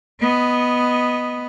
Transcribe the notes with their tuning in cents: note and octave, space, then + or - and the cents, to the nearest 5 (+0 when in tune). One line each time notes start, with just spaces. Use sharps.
B3 +0 D#5 +0